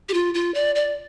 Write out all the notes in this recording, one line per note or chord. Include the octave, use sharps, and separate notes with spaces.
G4
F4
F4
D5
D5